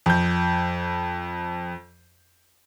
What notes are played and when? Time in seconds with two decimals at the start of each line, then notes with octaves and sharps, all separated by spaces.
0.06 F2 G6